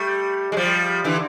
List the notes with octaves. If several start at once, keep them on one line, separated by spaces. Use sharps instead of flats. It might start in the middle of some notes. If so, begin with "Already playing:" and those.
Already playing: G3 A3
G#3
F3 G3
D3 E3